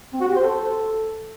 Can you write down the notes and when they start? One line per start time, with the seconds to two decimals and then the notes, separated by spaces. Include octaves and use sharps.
0.13 C4
0.20 F#4
0.28 G4
0.35 C5
0.43 A4